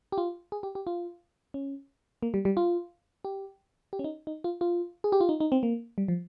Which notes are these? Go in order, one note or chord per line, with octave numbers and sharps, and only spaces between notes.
G4
F4
G#4
G4
G4
F4
C#4
A#3
G3
G3
F4
G4
G4
C#4
D#4
D#4
F4
F4
G#4
G4
F4
D#4
D#4
C4
A#3
G3
F3